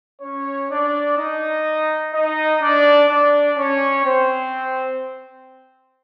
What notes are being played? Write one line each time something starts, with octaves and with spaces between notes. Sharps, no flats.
C#4 C#5
D4 D5
D#4 D#5
D#4 D#5
D4 D5
D4 D5
C#4 C#5
C4 C5